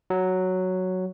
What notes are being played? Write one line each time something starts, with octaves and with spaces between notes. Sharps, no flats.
F#3